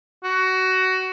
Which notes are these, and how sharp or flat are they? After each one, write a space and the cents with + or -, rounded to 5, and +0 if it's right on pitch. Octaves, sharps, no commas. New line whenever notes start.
F#4 +20